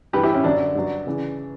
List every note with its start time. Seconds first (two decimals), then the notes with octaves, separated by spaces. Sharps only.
0.13 G2 E3 G4 B4
0.23 E4 G4
0.35 C#4 E4
0.44 F#2 D3 F#3 D4
0.75 G2 F#3
1.07 C#3 E3